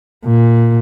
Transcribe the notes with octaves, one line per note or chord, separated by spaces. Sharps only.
A#2